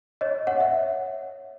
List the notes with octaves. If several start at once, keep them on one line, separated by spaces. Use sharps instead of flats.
C#5 D#5
C#5 F#5
E5